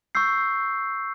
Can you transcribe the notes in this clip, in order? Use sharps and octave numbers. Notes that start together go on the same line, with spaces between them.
C#6 E6 G6 C7